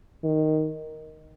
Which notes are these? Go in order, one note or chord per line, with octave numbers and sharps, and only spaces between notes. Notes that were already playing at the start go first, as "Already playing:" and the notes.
D#3